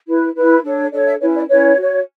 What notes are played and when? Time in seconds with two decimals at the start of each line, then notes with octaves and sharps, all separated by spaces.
0.06 E4 B4
0.35 E4 B4
0.63 D4 A4 C#5
0.91 D4 A4 C#5 D5
1.06 E5
1.19 C#4 E4 B4 C#5
1.35 D5
1.49 C#4 E4 B4 C#5
1.77 F#4 C#5